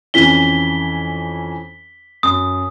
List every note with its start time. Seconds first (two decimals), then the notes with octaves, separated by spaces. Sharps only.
0.14 F2 E3 C#4 B6 G7
2.23 F#2 D#6